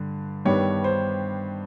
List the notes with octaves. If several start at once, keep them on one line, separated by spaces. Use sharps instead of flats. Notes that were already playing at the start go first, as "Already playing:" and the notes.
Already playing: G2 D3
G2 D#3 G3 B3 D4 C#5
C5